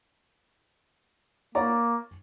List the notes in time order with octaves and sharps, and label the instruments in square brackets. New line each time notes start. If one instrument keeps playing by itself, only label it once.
[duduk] A#3 [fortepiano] C#5 D5 A#5